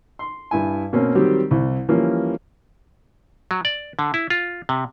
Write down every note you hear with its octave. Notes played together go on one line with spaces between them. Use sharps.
C6
G2 E4 G#5
B2 A#3 C4 C#4
D#3 F#3 G3 C4 G4
C2 E4
E3 F3 G3 A#3 C#4
F#3
D5
D3
E4
F4
C3